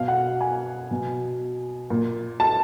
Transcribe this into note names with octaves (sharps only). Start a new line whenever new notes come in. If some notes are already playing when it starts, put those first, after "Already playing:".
Already playing: B2 F5
F#5
G#5
B2
A#2
A5